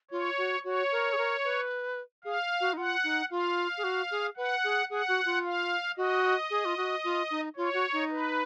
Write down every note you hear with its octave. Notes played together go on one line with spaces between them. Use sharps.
F4 C#5
F#4
F#4 C#5
A#4
G#4
A#4
B4
G#4 F5
F#4
D#4
F4 F#5
D#4
F4 F5
G#4
F#4
G#4
B4 F#5
G#4
G#4 F#5
F#4
F4
F5
F#4 D#5
G#4
F4
F#4
F4
D#4
F4 C#5
F#4
D#4
B4